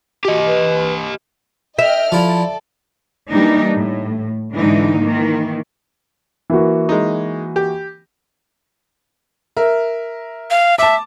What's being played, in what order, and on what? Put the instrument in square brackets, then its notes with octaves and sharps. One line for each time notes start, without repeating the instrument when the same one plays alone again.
[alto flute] F#4 [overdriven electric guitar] G4 D#5
[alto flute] B4
[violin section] D#5 G5 F6 [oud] E5
[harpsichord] F3 E4 [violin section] A4 D5
[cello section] E3 G3 A#3 D4 D#4
A2
G#2 D3 E3 G#3 D#4
D#3 E3 A#3
[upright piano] E3 A#3 F#4
[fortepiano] G#3 D#4
G4
[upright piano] A#4 E5
[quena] F5
[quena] E5 [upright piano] A5 D6